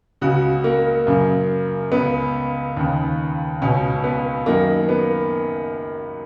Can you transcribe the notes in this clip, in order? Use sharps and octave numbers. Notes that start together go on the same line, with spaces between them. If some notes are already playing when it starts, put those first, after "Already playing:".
C#2 C#3 F#4
A#3
F#2 C#3
C#2 C#3 B3
D#2 C#3
C#2 B2 C#4
B3
F#2 D#3 A#3
B3